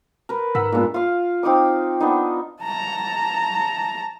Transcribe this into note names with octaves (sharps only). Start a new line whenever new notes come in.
A#4 B4
G#2 A#4 F#5 E6 B6
A#2 G#3 B3 D4 F4
F4 F5
C4 D#4 D6 D#6
B3 D4 D#4
A5 A#5